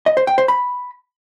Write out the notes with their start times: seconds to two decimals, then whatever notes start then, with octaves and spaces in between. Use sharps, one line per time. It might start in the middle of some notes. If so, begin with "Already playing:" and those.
0.06 D#5
0.17 C5
0.27 G5
0.38 C5
0.48 B5